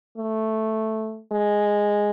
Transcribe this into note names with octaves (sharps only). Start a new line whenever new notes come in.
A3
G#3